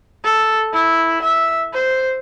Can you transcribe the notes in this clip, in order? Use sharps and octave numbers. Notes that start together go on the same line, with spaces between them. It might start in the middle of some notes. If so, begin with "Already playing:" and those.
A4
E4
E5
C5